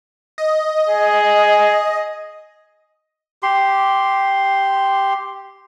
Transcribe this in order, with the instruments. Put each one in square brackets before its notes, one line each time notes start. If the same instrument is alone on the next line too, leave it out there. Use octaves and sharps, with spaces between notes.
[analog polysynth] D#5
[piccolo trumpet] G#4
[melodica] G4 C6